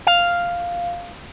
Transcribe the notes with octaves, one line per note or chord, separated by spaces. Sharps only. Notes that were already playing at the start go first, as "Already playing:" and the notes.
F5